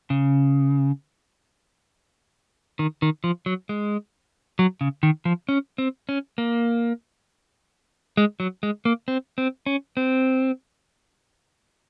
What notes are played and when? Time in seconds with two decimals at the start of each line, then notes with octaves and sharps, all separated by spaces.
0.10 C#3
2.79 D#3
3.02 D#3
3.24 F3
3.46 F#3
3.69 G#3
4.59 F#3
4.81 C#3
5.03 D#3
5.25 F3
5.49 C#4
5.78 C4
6.09 C#4
6.38 A#3
8.17 G#3
8.40 F#3
8.63 G#3
8.85 A#3
9.08 C4
9.38 C4
9.66 C#4
9.97 C4